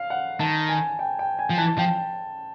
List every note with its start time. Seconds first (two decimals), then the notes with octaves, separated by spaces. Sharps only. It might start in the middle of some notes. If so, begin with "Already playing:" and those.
Already playing: F5
0.10 F#5
0.40 D#3 A5
0.69 G#5
0.99 G5
1.19 G5
1.39 G#5
1.50 F3
1.58 E3 A5
1.78 F3 G5